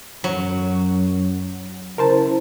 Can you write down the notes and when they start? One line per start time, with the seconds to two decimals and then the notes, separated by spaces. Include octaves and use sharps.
0.24 F#2 F#3
1.98 C#3 E4 A#4 C5 A5